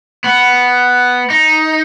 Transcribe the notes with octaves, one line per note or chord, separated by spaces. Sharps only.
B3
D#4